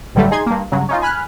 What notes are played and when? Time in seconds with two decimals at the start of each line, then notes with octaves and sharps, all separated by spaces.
0.15 A1 G2 D3 F#3 G3 A3
0.31 D#4 G#4 C6 G#6
0.46 G2 A#3
0.72 G2 C#3 F#3
0.89 C#4 D#4 F4
1.02 G#5 B5 F6 F#6